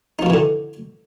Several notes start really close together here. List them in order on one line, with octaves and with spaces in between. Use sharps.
D#4 F3 B2 E3 D3